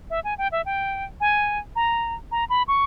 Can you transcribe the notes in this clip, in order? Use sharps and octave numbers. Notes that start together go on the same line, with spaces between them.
E5
G#5
G5
E5
G5
G#5
A#5
A#5
B5
C#6